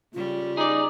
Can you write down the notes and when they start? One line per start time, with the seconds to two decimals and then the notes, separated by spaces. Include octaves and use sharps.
0.14 C#3 G3 F4
0.57 D#4 G#4 D5